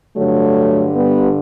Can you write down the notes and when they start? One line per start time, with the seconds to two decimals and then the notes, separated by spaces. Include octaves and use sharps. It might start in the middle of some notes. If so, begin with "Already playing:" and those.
0.16 G2 D3 F#3 A3
0.94 G3 B3